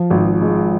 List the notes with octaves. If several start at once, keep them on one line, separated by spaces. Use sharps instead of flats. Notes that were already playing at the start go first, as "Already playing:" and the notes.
Already playing: F3
G#1
G#3